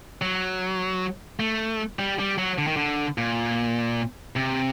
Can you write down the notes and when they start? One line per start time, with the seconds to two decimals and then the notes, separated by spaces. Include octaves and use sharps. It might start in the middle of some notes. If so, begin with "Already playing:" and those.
0.22 F#3
1.40 A3
1.99 G3
2.19 G3
2.38 F#3
2.58 D3
2.67 D#3
2.77 D3
3.18 A#2
4.36 C3